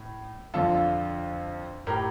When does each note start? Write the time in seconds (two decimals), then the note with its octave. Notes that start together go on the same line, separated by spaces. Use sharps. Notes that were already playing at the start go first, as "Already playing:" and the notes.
Already playing: A2
0.54 F2 D3 F4 A4
1.87 A2 G4 A#4